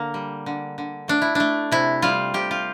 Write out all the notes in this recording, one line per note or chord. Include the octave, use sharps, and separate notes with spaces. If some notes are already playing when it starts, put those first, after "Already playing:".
Already playing: D3 A#3
G3
D3
D3
A3 D4
E4
A3 D4
C3 E4
G3 F4
C3 G4
F4